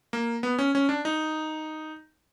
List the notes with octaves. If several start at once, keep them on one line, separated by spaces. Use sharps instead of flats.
A#3
B3
C#4
C#4
D4
D#4